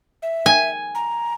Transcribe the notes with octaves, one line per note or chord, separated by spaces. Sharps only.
E5
G#5
A#5